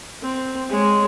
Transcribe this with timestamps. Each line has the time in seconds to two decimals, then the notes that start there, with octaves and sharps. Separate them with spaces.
0.22 C4
0.70 G#3 C#5